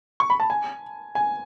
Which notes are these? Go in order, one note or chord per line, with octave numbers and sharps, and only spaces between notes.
C#6
B5
A5
G#5
G#5